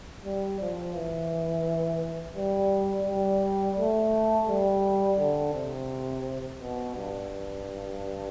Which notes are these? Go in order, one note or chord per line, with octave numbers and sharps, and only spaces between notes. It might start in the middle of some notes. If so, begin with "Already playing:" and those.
G3
F3
E3
G3
G3
A3
G3
D3
C3
B2
G2